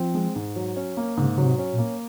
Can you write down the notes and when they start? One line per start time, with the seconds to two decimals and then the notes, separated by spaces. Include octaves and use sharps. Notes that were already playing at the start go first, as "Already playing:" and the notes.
Already playing: F3 C4
0.14 G#3
0.36 G#2
0.56 F#3
0.76 C#4
0.97 A#3
1.17 G#2 C#3
1.35 C#3 F#3
1.44 C3
1.59 C#4
1.73 A#2
1.79 A#3